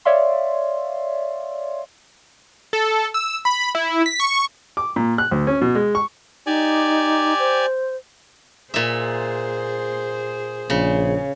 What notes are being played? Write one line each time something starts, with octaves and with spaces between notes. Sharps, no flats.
C#5 D5 E5 F5 C6
A4
E6
B5
E4
B6
C#6
D6
A#2
F#6
D2
C#4
B2
G#3
C#6
D#4 G4 D5 G#5
C5
A#2 G#4 C5 E5
A#1 C#3